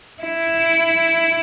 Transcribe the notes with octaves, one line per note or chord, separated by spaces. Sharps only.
E4